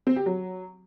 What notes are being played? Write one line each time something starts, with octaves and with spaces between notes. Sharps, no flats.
C4
G4
F#3